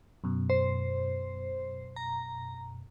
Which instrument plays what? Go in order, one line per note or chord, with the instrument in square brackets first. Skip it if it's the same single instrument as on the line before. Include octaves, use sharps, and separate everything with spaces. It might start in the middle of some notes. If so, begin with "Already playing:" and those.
[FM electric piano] F#2 B2
[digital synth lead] C5
A#5